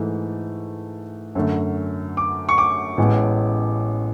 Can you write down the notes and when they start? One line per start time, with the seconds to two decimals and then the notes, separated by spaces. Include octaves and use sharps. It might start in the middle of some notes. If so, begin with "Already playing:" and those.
Already playing: G#2 E3 A3
1.35 F#2 D3 A3
2.17 D6
2.49 C#6
2.58 D6
2.97 A1 A2 G#3 B3